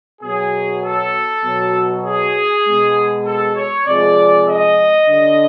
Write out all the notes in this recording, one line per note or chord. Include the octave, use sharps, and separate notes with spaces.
B2 F#3 G#4
A4
B2 F#3
G#4
B2 G#3
A4
C#5
C3 F3 G#3 D5
D#5
D3 G3